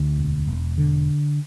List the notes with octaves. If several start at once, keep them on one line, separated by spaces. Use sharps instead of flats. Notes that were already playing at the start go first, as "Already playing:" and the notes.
Already playing: D2
E1
E1
D3